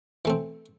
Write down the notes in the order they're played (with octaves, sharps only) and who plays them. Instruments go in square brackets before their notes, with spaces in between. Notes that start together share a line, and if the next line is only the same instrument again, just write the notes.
[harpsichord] E3 A3 C4